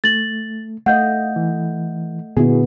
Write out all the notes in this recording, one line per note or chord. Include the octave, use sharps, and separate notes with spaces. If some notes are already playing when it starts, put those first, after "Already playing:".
A3 A6 F#7
A3 D#5 F5 F#5 G6
E3
A#2 D3 B3 E4 F#4 G#4